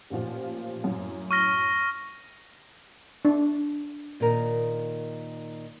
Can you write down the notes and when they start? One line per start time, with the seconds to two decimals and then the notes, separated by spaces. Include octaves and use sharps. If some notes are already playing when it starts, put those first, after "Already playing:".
0.10 A1 A#2 F3
0.84 F#2 A2
1.31 C#6 F6 A#6
3.25 D4
4.20 A#2 D#3 A#4